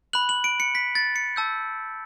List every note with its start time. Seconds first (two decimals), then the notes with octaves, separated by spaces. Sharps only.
0.13 B5 F#6 F#7
0.29 F#7
0.44 D7
0.60 C#7
0.75 B6
0.95 A6
1.16 C#7
1.36 A5 E6 G6